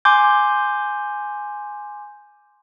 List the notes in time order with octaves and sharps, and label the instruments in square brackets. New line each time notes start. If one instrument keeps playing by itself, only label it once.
[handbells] G#5 C6 D6 G6